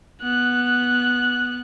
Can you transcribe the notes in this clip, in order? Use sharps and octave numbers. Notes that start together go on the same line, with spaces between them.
B3 F#6